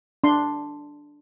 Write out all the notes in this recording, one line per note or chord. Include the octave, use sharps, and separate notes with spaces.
D4 C6